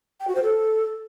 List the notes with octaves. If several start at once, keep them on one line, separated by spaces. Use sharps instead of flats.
G5
F#4
C5
A4